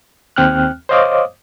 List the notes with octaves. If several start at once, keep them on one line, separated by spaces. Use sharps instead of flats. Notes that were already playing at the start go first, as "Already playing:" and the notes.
D#2 C4 G5 F6 F#6
C5 C#5 D#5 F5 D6 D#6